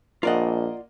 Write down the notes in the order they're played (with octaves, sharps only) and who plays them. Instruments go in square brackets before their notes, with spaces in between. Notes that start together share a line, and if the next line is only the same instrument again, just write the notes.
[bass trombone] A#1 [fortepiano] A#3 D#5 [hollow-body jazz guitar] F4 D5 F#5